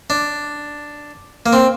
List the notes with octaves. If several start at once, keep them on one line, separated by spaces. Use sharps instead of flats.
D4
A#3
C4